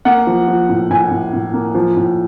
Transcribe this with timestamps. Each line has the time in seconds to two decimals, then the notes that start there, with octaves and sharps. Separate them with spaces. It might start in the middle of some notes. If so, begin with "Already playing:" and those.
0.05 A#3 F#5
0.27 F3
0.48 F3
0.69 A2
0.90 A2 G#5
1.11 A2
1.33 A2
1.54 A#3
1.75 F3
1.96 A2